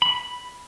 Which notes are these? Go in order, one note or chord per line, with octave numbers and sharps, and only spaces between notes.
B5